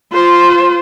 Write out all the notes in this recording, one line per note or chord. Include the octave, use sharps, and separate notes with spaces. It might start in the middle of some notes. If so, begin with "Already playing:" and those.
F4 C5